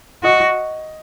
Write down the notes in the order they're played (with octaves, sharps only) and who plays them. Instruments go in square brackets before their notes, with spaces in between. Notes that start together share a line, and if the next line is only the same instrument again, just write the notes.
[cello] F#4 [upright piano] D#5